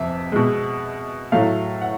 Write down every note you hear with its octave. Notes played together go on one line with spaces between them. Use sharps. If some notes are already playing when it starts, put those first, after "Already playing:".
Already playing: F2 C3 E5
B2 G#3
A2 F#3 A3 F5
F#5